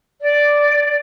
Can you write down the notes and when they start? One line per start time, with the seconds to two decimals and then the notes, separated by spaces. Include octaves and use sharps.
0.21 D5